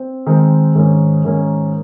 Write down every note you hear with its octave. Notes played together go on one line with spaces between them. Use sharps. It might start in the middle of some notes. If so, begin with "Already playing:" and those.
Already playing: C4
D#3 G#3 C4
G#2 D#3 A#3 C#4
G#2 D#3 A#3 C#4